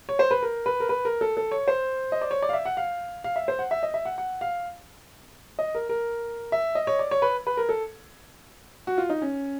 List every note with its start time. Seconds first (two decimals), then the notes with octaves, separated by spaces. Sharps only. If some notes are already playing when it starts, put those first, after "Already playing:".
0.09 C#5
0.19 C5
0.31 B4
0.43 A#4
0.66 B4
0.80 A#4
0.89 B4
1.05 A#4
1.21 A4
1.37 A4
1.51 C#5
1.68 C5
2.12 D#5
2.22 D5
2.31 C#5
2.42 D5
2.49 F5
2.53 E5
2.66 F#5
2.77 F5
3.24 F5
3.36 E5
3.48 C5
3.59 F#5
3.71 E5
3.83 D#5
3.94 E5
4.05 F#5
4.18 F#5
4.41 F5
5.59 D#5
5.75 A#4
5.89 A#4
6.52 E5
6.75 D#5
6.87 C#5
6.99 D5
7.11 C#5
7.22 B4
7.47 B4
7.57 A#4
7.69 A4
8.87 F#4
8.98 F4
9.10 D#4
9.22 C#4